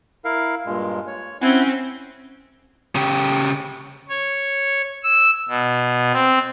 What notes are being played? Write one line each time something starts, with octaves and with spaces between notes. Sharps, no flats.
E4 A#4 F5
G2 A#2 G#3
C#5
C4 C#4 E4 F#5 G#5
C#3 G4
C#5
E6
B2
C4